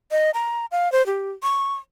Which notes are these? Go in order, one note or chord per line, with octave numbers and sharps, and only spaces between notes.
D#5
A#5
F5
C5
G4
C#6